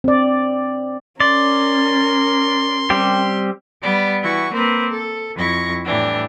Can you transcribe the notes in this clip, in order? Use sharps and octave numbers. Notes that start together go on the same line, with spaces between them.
C4 D5
C#4 A#4 D5 C6
G3 C4 G4
G3 B3 D5
E3 E4 F#4 C#6
A#3 C4 B4 C5
A4
F2 F3 E4 C#6 A#6
A2 E3 G3 D4